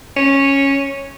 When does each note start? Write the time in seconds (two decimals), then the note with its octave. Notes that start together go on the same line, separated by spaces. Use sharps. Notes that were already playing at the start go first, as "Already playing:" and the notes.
0.17 C#4